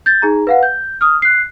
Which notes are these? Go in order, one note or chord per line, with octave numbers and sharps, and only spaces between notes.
G6 A6
D#4 G#4 A#5
B4 F5 F#5
G6
D#6 F6
F#6 C7